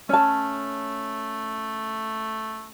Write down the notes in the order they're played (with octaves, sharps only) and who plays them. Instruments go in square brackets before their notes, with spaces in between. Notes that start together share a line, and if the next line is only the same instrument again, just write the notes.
[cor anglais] A3 [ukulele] C#4 A5